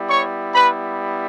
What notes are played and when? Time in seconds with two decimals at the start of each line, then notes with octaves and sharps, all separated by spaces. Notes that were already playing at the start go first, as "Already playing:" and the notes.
Already playing: G3 B3 E4
0.10 C#5 C#6
0.54 B4 B5